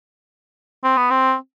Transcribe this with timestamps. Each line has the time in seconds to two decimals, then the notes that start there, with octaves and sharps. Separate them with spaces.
0.84 C4
0.97 B3
1.10 C4